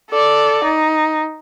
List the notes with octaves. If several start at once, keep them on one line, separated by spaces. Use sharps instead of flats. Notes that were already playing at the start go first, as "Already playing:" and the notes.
A4 D5
D#4